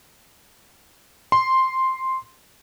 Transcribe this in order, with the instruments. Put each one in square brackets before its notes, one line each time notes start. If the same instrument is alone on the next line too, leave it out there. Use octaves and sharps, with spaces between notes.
[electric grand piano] C6